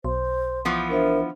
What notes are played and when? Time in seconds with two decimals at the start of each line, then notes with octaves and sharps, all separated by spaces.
0.04 B1 C5 C6
0.65 E3 F3 B3
0.90 D4 A#4 C5 E5